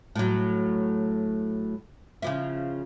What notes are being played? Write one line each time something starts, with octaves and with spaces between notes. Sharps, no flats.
A2 F#3
C#3 F3 E4